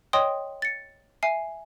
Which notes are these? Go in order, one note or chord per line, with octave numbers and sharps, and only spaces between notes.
C#5 D#5 G5 C6 D#6
A6 C#7
E5 G#5 C7